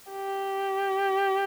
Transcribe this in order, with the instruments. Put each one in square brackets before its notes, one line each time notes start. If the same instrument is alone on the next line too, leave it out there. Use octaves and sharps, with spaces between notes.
[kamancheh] G4